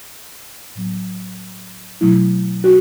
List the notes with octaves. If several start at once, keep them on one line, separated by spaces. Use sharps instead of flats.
A2 F#3 B3
B2 F#3 A3 E4
F#4